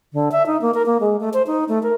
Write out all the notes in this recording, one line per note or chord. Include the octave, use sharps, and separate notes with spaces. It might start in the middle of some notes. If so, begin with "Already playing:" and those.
D3
E5
D#4
A#3
A#4
A#3
G#3
A3
C5
D#4
A3
A#4